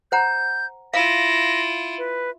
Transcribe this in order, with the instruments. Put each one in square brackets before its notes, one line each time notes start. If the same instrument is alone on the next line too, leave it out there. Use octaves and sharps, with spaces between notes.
[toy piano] C5 F#5 A#5 [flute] G6
[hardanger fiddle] E4 F4 [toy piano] F5 [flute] A#6
[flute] B4